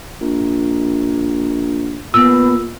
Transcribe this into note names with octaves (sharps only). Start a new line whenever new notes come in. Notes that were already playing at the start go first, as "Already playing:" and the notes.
A#1
A#2 B3 E6